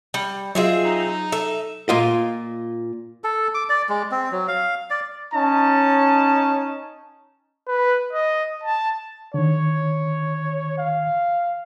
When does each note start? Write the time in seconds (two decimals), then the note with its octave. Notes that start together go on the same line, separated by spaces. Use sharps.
0.14 G3
0.55 F#3 C4 F4 G#4 D#5 E5
0.84 D#4
1.32 A4 E5
1.89 A#2 F4 D#5
3.24 A4
3.54 D6
3.69 D5
3.89 G#3
4.11 C4
4.32 F#3
4.48 F5
4.90 D5
5.33 C#4 D#4 A5
7.68 B4
8.13 D#5
8.63 A5
9.34 D3 D#3 C#5
10.78 F5